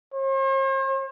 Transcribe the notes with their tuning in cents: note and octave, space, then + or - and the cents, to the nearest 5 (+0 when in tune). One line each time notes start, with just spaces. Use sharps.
C5 +45